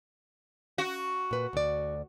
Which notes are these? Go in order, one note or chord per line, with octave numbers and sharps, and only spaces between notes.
F#4
A#2 B4
D2 D5